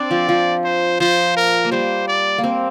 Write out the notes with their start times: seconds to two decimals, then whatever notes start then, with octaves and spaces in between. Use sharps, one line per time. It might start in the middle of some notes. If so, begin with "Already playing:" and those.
Already playing: C4 D4 D5
0.11 F3
0.29 F3
0.64 C5
1.00 F3 C5
1.36 A#4
1.65 A#3
1.71 G3 C5
2.08 D5
2.38 A#3
2.44 C4